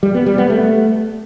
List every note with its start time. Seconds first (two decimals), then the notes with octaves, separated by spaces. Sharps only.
0.03 G3
0.15 B3
0.26 G3
0.38 B3
0.50 A3